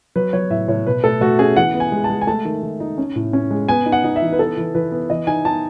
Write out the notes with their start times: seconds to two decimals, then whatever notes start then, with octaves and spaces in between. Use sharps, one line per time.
0.16 F#3 B4
0.33 F#3 C#5
0.50 A2 E5
0.68 A2 C#5
0.86 B2 B4
1.04 A3 A4
1.21 A3 F#4
1.39 C#4 G#4
1.56 E3 F#5
1.74 B3
1.80 G#5
1.92 G#3
2.04 A5
2.10 G#3
2.21 G#5
2.27 A3 A5
2.45 D#3
2.63 D#3
2.80 D#4
2.98 C#4
3.16 A2
3.33 C#4
3.51 G#3
3.68 B3 G#5
3.86 D#4
3.92 F#5
4.04 D#4
4.16 E5
4.22 E3
4.32 B4
4.39 B3 A4
4.57 E3
4.74 E3 B4
4.92 B3
5.10 E3 D#5
5.27 D#4 G#5
5.45 D#4 A5